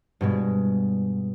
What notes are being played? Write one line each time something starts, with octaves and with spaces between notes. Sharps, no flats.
G2 B2 G#3